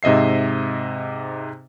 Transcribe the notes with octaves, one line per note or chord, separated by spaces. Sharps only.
G#2 C3 D#5 E5 C7